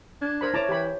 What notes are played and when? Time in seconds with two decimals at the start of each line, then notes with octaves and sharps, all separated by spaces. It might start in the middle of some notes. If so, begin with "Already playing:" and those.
0.22 D4 G#6
0.41 A#4 C5 B5
0.54 E4 C#5 A5 A#5 D6
0.69 E3 G4 B5